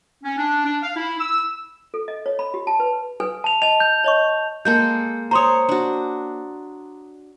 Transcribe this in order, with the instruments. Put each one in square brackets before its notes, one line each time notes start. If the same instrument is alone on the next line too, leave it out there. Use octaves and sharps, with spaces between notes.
[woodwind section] C#4
D4
D4
F5
E4
E6
[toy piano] A4
D#5
C#5
B5
G4
A5
B4
A4 B4 G#5
[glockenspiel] A5 F7
[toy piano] D#5 A5 [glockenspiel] F7
[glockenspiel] G6
[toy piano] C#5 D#5 C#6
[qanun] G#3 A#3 A4 [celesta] G6
[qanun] C5 C#5 [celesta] A#5 C6 D#6
[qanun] D4 F#4